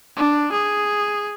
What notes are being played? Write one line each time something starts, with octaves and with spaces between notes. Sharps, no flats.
D4
G#4